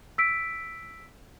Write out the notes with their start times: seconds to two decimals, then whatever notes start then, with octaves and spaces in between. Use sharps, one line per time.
0.18 E6 B6 D7